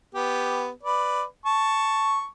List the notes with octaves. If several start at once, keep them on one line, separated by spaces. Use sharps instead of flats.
B3 G4
B4 D5
A5 C#6